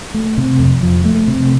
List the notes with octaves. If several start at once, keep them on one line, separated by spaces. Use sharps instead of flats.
A3
C3
F2
F3
A3
C3